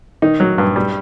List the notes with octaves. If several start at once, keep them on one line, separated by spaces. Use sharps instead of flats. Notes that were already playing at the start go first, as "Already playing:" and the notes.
D#3 D#4
F#3
G2
G3